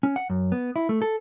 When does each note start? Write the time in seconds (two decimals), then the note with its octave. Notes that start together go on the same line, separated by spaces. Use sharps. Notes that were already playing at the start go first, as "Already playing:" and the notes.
0.03 C#4
0.16 F#5
0.30 F#2
0.52 B3
0.76 E4
0.89 A3
1.02 A4